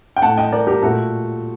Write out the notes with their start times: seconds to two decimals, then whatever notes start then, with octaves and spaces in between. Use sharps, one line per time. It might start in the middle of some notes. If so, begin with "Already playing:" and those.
0.17 G5
0.22 A2 A3 F#5 A5
0.38 D#5 G5
0.52 A#4 D5
0.67 G4 A#4
0.82 A#2 A3 F#4 A4